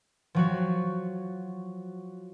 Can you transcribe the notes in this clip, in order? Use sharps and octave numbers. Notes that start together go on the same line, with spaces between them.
F3 F#3 F#4